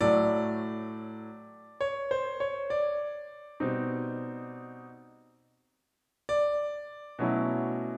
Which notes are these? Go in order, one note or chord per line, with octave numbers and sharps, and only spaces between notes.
A2 F#3 A3 D5
C#5
C5
C#5
D5
B2 G3 C4 D#4
D5
B2 F#3 A3 C#4 E4